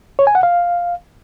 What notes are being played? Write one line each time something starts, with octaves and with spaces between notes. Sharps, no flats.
C#5
G#5
F#5
F5